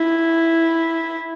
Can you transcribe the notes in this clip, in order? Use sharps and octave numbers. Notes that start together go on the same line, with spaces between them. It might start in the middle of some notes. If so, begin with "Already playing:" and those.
Already playing: E4